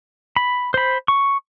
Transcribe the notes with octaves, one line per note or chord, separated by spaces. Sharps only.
B5
C5 B5
C#6